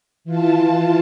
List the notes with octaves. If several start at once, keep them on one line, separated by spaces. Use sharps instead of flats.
E3 F4 A5